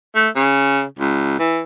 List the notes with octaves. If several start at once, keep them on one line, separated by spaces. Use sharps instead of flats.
A3
C#3
C#2
E3